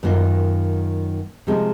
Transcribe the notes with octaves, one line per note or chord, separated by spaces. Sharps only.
F#2 D#3 A#3 F4
C3 F3 G#3 C4